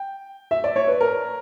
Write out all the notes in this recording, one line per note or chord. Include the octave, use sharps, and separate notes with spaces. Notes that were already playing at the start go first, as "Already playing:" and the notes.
Already playing: G5
E5
D5
C#5
B4
A#4